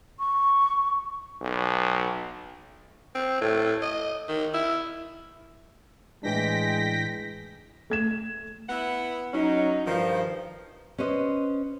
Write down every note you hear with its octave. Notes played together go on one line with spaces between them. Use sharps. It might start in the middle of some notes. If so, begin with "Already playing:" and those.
C#6
B1
C4
A2
D#5
D#3
E4
A2 E3 G#3 D4 G5 A#6 B6
A3 G#6 E7
B3 E4 F#5
F#3 C#4 D#4
G2 D#3 F3
C#4 B4 C5 D#5